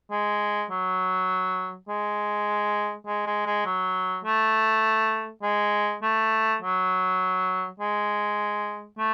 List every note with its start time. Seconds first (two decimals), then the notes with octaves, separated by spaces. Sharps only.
0.11 G#3
0.70 F#3
1.88 G#3
3.07 G#3
3.26 G#3
3.46 G#3
3.66 F#3
4.25 A3
5.43 G#3
6.02 A3
6.61 F#3
7.80 G#3
8.98 A3